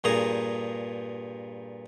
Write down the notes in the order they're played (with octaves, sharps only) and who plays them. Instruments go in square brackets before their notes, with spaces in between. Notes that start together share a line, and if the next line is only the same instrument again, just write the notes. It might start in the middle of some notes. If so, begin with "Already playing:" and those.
[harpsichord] G2 A#2 G#4 A#5